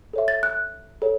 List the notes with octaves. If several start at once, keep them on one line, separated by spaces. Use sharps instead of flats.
A4 C#5 E5
A6
F#6
A4 C#5